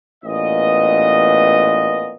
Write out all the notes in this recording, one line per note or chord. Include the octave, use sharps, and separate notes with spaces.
A1 A#2 B3 D#5